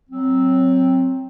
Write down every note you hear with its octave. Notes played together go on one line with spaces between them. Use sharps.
F#3 C4